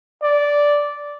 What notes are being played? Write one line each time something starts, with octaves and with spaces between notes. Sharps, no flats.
D5